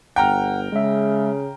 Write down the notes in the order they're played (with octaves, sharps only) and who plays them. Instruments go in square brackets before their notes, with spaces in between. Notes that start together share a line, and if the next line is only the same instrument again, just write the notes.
[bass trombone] G1 [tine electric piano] F#5 [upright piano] G5 A#5 F6
[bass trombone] C#3 [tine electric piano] G#3 E5